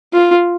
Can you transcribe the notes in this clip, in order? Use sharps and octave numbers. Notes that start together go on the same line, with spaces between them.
F4